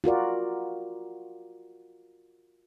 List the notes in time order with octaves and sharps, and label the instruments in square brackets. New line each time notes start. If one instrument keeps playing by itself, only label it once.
[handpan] F4 F#4 A#4 D5